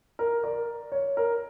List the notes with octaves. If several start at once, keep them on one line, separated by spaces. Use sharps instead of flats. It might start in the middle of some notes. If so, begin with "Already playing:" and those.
A#4
A#4 D5
C#5
A#4